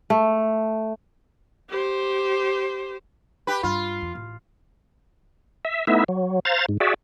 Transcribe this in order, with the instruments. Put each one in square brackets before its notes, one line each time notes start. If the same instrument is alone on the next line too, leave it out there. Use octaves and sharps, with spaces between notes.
[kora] A3
[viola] G4 C5
[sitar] G4 B4
[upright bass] G2 [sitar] F4
[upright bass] F2
A1
[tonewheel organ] E5
A3 B3 D#4 E4 E5
F#3
C5 F5 A#5 A6
G#2
F#4 G#4 D5 E5